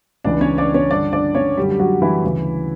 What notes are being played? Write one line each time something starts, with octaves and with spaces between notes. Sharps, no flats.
C#2 C#3 E3 D4 D5
C#4 C#5
D4 D5
C#4 C#5
G2 D3 D4 D5
D4 D5
C#4 C#5
F#2 D3 G3 G4
G4
F#3 F#4
E3 E4
D2 C#3 E3